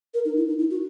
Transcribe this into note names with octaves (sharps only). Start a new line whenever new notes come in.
A#4
D#4
E4
D#4
E4
F#4